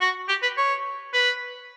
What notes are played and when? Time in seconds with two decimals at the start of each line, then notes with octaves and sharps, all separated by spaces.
0.01 F#4
0.29 G4
0.43 B4
0.57 C#5
1.13 B4